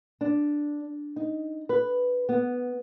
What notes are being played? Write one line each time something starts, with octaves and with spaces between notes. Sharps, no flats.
D4
D#4
B4
B3